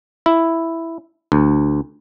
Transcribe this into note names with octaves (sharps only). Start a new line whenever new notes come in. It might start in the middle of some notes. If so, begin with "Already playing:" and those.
E4
D2